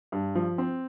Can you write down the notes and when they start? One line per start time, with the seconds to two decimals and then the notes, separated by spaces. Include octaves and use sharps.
0.12 G2
0.35 F3
0.58 C4